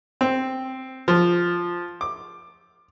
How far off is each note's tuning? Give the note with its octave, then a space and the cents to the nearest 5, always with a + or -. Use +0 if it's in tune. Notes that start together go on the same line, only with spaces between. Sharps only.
C4 +0
F3 +0
D6 +15